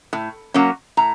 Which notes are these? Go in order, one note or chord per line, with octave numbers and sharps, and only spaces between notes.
A2
F#3 A#3 C#4
A2 A#5